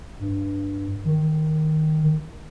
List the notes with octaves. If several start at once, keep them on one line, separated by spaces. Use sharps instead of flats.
G2
D#3